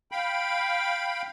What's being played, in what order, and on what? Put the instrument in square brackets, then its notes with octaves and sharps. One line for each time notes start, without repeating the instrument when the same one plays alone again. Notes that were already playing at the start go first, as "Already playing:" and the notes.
[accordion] F5 G5 B5